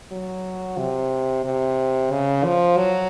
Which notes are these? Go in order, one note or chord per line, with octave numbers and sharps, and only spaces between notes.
F#3
C3
C3
C#3
F3
F#3